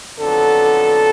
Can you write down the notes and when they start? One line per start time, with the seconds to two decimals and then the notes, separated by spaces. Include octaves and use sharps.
0.20 F2 D3 F#3 B3 A4